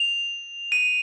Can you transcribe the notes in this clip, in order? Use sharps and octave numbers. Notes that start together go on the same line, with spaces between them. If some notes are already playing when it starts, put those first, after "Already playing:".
Already playing: F7
D#7